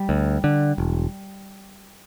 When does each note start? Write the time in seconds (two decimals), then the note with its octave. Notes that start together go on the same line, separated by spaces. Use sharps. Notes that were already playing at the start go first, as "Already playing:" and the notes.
Already playing: G3
0.09 D2
0.44 D3
0.78 E1